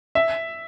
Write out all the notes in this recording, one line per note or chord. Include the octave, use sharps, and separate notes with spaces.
E5